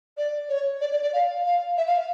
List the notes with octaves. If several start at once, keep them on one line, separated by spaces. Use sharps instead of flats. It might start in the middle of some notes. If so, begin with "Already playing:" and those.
D5
C#5
D5
D5
D5
F5
F5
E5
F5